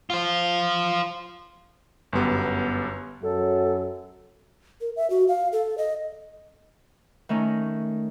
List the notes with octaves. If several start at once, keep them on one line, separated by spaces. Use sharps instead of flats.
F4 C5
G1 F#2 B3 G4
F#2 F#3 A4
A#4
E5
F#4
F5
A4
D#5
D#3 A3 C#4 D#4